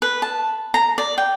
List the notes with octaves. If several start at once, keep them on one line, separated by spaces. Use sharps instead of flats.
B4
A5
A#5
D5
G5